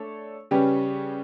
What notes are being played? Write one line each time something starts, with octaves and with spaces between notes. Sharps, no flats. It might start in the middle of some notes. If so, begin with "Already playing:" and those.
Already playing: A3 D4 A4 C#5
C#3 G3 C#4 G4 B4